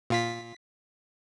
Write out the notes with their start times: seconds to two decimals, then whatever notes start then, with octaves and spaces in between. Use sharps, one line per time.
0.10 A#2 F4 B6